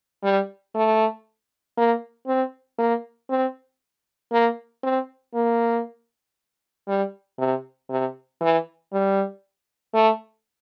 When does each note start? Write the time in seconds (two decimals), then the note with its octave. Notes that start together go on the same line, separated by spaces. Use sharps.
0.23 G3
0.75 A3
1.77 A#3
2.27 C4
2.79 A#3
3.30 C4
4.32 A#3
4.83 C4
5.34 A#3
6.88 G3
7.38 C3
7.90 C3
8.41 E3
8.93 G3
9.94 A3